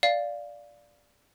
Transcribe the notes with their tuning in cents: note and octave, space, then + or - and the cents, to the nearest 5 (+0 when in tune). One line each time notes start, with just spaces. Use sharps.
D5 +0 F5 +0